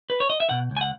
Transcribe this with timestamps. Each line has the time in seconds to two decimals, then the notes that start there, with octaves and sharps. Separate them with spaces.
0.10 B4
0.20 C#5
0.30 D#5
0.40 E5
0.49 B2 F#5
0.71 C#2
0.77 G#5
0.81 F#5